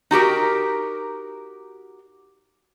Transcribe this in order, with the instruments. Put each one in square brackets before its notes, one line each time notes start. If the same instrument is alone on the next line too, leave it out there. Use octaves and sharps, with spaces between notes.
[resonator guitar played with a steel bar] D#4 F#4 G4 A#4